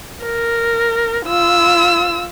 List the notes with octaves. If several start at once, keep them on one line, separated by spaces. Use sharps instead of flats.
A#4
F4 E6